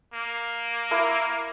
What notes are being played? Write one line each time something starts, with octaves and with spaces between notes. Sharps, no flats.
A#3
E4 A#4 D6